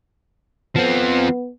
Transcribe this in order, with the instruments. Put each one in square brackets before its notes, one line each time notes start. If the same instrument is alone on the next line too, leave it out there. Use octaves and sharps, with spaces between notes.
[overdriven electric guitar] F3 C4 [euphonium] B3